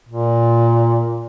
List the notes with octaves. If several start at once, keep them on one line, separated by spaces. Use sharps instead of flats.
A#2